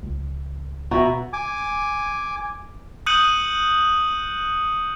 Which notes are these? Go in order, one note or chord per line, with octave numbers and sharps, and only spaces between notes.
C#2
B2 F#4 E5 A#5
G#5 D6
D#6 F#6 G6 C#7 D#7 F#7